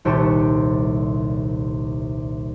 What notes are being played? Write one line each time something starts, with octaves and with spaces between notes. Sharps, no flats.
D#1 C2 G4 A5 C#6 D#7